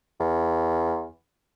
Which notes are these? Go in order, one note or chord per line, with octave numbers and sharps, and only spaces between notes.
E2